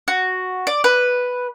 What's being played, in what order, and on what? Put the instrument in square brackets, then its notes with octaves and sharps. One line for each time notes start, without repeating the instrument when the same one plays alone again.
[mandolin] F#4
D5
B4